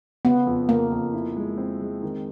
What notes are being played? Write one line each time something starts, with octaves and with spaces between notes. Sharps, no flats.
C#3 B3
F2
C#3 A#3
F2
E4
G#3
C4
G#3
D#3